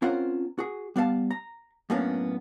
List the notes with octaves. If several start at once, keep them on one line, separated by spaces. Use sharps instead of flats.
C4 C#4 F4 A#4 C5 F#5
F#4 G#4
G3 B3 D5 F5 A5
A#5
F#2 A2 A#3 B3 C#4 D4